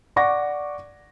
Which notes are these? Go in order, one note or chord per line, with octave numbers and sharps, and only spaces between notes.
D5 F#5 C#6 D6 A#6